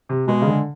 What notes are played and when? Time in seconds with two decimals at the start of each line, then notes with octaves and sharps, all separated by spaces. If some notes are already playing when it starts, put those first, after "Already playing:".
0.09 C3
0.28 B2 G#3
0.42 C#3
0.47 D3